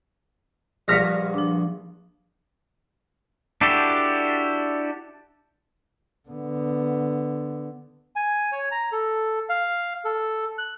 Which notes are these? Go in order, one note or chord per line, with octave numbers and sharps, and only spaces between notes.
A#1 G2 F#5 F6 A#6 B6
F3 D4
D4 E4 F#4 G4 A4
D3 B3
G#5
C#5
A#5
A4
F5
A4
F#6